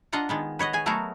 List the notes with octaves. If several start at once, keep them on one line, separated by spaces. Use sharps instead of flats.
D4 F4 D#5 F#5 A#5
D#3 G#3 B3
B4 C#5 D#5 F#5
G#4 G#5
F#3 A3 B3 F#4 G#4 A#4